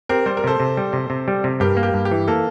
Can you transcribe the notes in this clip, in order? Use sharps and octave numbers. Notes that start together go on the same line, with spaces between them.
C4 G4 A#4
G3 C5
A#4
C3 A4 C5
C3
G3
C3
C3
G3
C3
G2 G4 A#4
A#3
G4
G2
G4
E3
A#3 A4